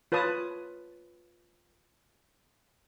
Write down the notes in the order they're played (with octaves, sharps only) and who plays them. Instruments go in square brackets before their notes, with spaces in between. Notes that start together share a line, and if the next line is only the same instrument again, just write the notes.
[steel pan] F4 B4 C#5 A5 D#6